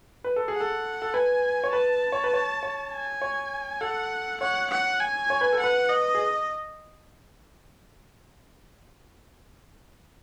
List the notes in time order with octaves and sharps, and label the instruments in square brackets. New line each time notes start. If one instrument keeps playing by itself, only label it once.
[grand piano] B4
A4
G#4
[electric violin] F#5
[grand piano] A4
A4
[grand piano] B4 [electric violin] G#5
[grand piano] C#5
[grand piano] B4 [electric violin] A5
[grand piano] C#5
B4
C#5
C#5
[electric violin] G#5
[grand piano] C#5
[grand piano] A4 [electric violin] F#5
[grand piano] C#5 [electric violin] F#5
[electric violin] F#5
G#5
[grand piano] C#5
B4
A4
[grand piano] B4 [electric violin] F#5
[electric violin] D#5
[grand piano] G#4